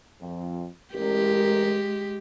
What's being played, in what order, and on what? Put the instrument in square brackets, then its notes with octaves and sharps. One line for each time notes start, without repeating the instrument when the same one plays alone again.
[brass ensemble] F2
[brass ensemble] A1 A#4 [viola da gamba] G#3 G4